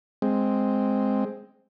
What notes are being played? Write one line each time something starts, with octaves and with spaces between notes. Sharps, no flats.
G#3 C4